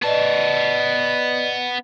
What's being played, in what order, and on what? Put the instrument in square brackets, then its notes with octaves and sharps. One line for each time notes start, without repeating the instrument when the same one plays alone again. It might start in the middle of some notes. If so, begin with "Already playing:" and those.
[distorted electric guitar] B3 A5 [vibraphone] B4 D5 D#5